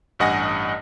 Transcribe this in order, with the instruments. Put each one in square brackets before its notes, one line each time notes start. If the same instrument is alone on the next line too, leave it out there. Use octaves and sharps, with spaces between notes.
[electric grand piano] A1 G2 D#5 F#5 G#5 A#6